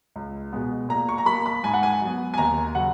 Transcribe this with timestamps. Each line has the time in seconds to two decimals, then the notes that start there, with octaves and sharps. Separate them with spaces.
0.16 C#2
0.53 B2 G#3 B3
0.89 A#2 A#5
1.09 C#6
1.18 A#5
1.26 A#3 B5
1.46 B5
1.63 G#2 G#5
1.74 F#5
1.83 G#5
2.01 F#3 B3
2.34 G#5
2.38 D#2 A#5
2.75 C#3 F#3 F#5